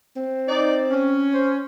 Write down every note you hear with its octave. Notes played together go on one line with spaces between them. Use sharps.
C4
D#4 D5
C#4
C5